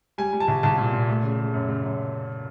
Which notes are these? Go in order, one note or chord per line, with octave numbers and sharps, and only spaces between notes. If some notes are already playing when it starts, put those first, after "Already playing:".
G3 G#5
G3
A5
C2
C2 A5
A#2
A#2
A3
C#3
C#3
F#2
C#3
F#2